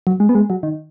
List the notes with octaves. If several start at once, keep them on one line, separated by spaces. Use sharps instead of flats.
F#3
G#3
B3
G#3
F#3
D#3